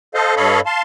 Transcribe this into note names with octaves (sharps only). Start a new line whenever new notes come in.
A4 C5 D#5 F5
G2 A4 C#5 D#5 F5 B5
F5 A5 C6